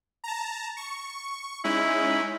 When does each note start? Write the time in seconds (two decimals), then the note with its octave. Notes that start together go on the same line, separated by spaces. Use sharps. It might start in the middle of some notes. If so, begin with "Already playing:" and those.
0.24 A5 A#5
0.77 C#6
1.64 G#3 C#4 D#4 E4